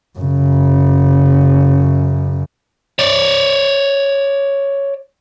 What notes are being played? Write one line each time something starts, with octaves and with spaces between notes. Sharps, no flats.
F#2 C#3
C#5 D5